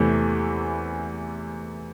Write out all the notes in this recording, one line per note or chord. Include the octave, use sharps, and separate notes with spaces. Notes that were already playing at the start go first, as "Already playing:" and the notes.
Already playing: E2 C3 E3 A3